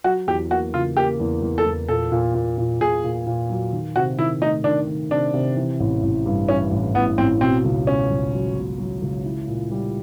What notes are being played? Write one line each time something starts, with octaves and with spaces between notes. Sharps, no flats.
F#3 F#4
E2 G4
A#3 F#4
C#3 F4
A#3 G4
E2
E2
A4
E2
A#2 A4
A#2
A#2
A#2
A#2 G#4
A#2
A#2
F#3
D#3
C3 F#4
D#3 E4
A3 D#4
D#3 D4
D#3
C3 D4
C3
E3
A1
A1
G2
E3 C#4
A1
A1 B3
A1 C4
B2 C4
C#2
B2 C#4
C#2
F#3
B2
F#3
C#2
E4
A#2
G3